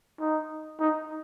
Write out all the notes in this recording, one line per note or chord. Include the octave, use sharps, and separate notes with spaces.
D#4
D#4